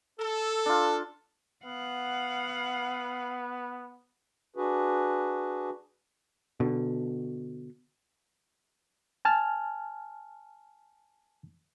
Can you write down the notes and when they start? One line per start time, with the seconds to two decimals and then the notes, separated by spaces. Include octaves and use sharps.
0.19 A4
0.66 D4 F4
1.65 B3 F5 F#5
4.56 D4 F#4 G#4 B4
6.60 B2 D3
9.25 G#5 A5 F6